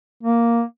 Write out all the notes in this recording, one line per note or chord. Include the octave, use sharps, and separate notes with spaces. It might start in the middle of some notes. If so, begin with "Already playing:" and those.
A#3